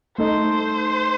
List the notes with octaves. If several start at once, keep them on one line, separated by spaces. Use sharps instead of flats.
A3 D#4 A4 C5